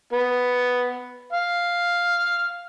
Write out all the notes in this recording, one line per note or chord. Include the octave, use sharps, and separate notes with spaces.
B3
F5